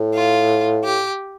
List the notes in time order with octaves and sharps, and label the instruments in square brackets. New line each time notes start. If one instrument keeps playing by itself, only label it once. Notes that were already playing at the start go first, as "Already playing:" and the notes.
Already playing: [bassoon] A2
[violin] F4
G4